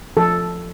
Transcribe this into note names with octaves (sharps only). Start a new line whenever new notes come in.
F3 A4